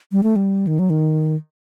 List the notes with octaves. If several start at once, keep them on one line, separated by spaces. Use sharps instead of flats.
G3
A3
G3
D#3
F#3
D#3